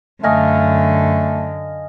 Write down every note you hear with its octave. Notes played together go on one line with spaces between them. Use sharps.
F#2 D3 A3 D#5 F5 G#5